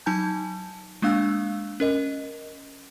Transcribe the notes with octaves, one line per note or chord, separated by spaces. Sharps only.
F#3 D#4 G#5 A5 G6
G#3 A#3 D4 F5 E6 F#6
C#4 A#4 D#5